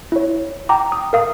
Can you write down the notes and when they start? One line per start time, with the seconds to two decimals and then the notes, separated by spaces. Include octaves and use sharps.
0.12 E4 C#5
0.69 G5 A#5 D6
0.92 D#6
1.13 A#4 F5 D#6